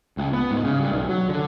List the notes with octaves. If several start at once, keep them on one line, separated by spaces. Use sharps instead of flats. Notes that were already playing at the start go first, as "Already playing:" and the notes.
C#2
B3
G#2
C#3
G2
B1
F#3
D3